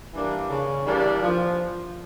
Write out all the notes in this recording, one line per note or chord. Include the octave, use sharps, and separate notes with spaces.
E3 G3 A#3 D4
C#3
E3 G3 A#3 D4
F3